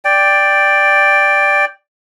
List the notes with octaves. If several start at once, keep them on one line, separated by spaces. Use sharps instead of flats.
D5 G5